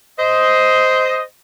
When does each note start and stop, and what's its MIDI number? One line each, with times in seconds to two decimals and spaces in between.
0.18 1.21 72
0.18 1.21 75